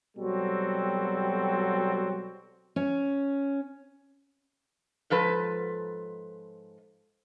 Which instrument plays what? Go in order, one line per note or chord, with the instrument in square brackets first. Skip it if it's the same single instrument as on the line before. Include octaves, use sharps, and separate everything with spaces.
[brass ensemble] B2 F#3 G3 C4 F#4 A4
[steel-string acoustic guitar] C#4
[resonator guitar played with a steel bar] G#2 F3 A4 B4